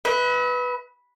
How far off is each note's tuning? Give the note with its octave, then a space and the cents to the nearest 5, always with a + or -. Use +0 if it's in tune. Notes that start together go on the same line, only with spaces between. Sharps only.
B4 +0 E5 -45